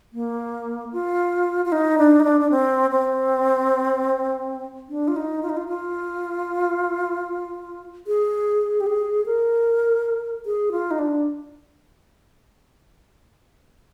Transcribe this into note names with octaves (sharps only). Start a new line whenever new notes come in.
A#3
F4
F4
D#4
D4
D#4
D4
D4
C4
C4
D4
F4
D#4
F4
D#4
F4
F4
G#4
G4
G#4
A#4
G#4
F4
D#4
D4